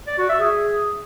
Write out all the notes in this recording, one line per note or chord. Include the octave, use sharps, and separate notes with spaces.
D5
F#4
E5
G#4